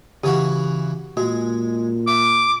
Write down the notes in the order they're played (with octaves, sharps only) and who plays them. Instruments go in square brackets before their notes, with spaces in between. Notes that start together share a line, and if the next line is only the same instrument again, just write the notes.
[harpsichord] C#3 E3 F#4 [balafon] G4
[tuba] A#2 [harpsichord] G#3 [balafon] F#4
[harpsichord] E5 [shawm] D6